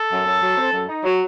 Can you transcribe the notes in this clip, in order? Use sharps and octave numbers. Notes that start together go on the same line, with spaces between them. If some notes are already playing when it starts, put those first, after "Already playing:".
Already playing: A4
F#2
F#2
F#3
C4
F#2
D#4
F#3